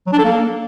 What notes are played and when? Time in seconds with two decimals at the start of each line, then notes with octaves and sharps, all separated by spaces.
0.07 F#3
0.12 D4
0.18 A4
0.24 A#3